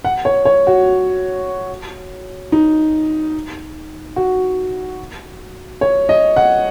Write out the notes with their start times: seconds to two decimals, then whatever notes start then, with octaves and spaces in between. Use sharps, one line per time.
0.05 F#5
0.25 C#5
0.45 C#5
0.67 F#4
2.52 D#4
4.16 F#4
5.81 C#5
6.09 D#5
6.36 F#5